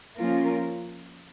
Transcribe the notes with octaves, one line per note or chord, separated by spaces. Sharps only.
F3 A#3 C#4 F4 A#4